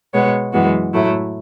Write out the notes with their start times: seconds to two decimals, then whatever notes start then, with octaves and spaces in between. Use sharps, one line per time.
0.14 B2 G#3 B3 C#5
0.53 F#2 E3 G#3 B3 F#4
0.93 A2 F#3 A3 E4